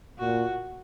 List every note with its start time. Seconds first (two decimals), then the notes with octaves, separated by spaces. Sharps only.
0.19 A#2 F#4